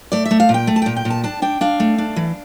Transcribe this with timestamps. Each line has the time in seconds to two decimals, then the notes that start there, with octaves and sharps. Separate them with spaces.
0.12 A3 D5
0.25 E5
0.31 A3
0.40 F5
0.49 A#2
0.54 G5
0.67 A3
0.76 A5
0.82 A#2 G5
0.96 G5
1.05 A#2
1.10 A5
1.24 D4 A5
1.42 D4 G5
1.61 D4 F5
1.80 A3
1.98 D4
2.16 E3